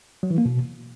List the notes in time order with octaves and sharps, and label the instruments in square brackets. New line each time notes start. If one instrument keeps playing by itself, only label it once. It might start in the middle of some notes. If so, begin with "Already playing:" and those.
[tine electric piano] F#3
E3
A#3
B2